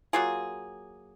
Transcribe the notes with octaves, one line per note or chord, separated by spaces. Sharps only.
F#3 A#3 F4 G#4